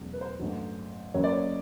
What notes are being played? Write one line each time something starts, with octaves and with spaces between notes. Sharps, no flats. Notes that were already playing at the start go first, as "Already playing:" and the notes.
Already playing: E1 E2 C#3 F#3 A3
B4
C5
A1 G2 D3 F#3
F#1 F#2 C#3 F#3 C#5
D5
C#5
D#5